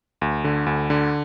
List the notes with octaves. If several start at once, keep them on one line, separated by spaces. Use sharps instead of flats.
D2
D3
D2
D3